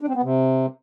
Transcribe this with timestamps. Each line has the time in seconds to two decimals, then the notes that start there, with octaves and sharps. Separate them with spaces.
0.01 D4
0.08 C4
0.16 B3
0.23 C3